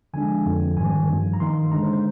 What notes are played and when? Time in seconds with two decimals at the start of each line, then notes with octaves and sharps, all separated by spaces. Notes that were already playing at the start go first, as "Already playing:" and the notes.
0.14 D3 F3 G#3 D4 G#5
0.45 F2 D3 F3 C4
0.77 G#2 D#3 G3 G#5
1.09 G2 F3 A#3
1.33 A#5
1.40 D#3 A#3 D#4 C6
1.72 D3 G#3 D4 A#5
1.82 C5
1.93 C5